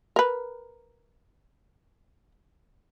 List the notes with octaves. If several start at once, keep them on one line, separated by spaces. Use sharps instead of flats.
A#4 B4